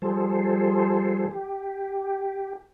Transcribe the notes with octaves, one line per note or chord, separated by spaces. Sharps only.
F3 G3 G#4 A4 C5
G4